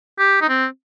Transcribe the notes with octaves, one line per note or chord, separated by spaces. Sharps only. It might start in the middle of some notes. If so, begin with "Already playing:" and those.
G4
D#4
C4